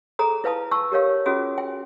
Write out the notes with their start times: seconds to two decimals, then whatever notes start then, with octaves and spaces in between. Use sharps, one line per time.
0.19 G#4 A4 A#5 D#6
0.44 E4 B4 F5 A5 D#6
0.71 A5 C#6 E6
0.92 G4 A#4 C#5 F5
1.26 C#4 F4 F#4 G#4 D#6
1.58 G5